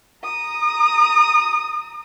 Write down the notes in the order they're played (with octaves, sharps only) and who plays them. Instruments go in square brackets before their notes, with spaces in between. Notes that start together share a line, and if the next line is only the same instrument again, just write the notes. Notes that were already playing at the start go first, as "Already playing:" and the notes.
[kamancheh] A#5 D#6